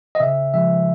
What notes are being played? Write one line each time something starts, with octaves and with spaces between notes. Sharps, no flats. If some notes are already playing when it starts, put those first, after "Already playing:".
D#5
C#3 E5
F3 G#3 E5